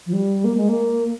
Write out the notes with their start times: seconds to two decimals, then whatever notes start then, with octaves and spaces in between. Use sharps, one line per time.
0.06 F3
0.13 G3
0.44 A#3
0.57 G#3
0.69 A#3